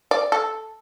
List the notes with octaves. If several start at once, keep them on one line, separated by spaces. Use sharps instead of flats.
D5
A4